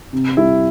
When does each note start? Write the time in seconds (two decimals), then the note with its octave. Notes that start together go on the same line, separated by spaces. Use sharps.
0.13 C3
0.37 G3 E4